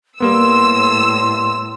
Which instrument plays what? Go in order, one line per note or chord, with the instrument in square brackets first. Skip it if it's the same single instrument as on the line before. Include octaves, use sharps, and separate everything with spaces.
[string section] A2 E6 [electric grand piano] G3 A#3 B3 [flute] C6